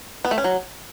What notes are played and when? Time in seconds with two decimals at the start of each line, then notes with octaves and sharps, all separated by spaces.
0.25 B3
0.31 A3
0.38 C#4
0.44 F#3